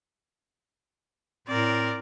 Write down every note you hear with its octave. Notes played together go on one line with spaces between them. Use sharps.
A2 C4 A#4 D5